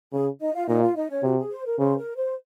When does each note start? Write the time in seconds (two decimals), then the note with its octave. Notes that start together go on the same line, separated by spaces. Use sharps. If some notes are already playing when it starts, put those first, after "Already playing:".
0.12 C#3 G#4
0.40 D#4 D#5
0.53 F4 F5
0.68 A#2 D#4 D#5
0.82 F4 F5
0.96 D#4 D#5
1.10 C#4 C#5
1.23 C3 F#4
1.38 G#4
1.51 C5
1.66 A#4
1.79 C#3 C5
1.97 A#4
2.16 C5